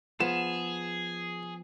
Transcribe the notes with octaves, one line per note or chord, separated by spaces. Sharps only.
F3 B3 G#4 E7